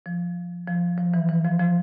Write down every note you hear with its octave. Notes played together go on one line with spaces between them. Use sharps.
F3
F3
F3
E3
E3
F3
F3